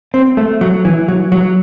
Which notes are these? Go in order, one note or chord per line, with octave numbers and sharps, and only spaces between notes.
C4
A3
F#3
E3
F#3
F#3